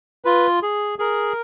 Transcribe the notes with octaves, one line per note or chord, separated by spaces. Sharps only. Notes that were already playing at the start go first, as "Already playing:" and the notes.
F4 B4
G#4
G#4 A#4